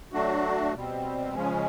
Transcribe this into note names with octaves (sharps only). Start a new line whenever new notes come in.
F#3 A3 D4 F#4
B2 G3 C4
C#3 F3 G#3 C#4